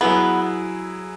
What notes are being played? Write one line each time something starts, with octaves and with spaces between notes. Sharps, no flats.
F#3 B3 E4 G#4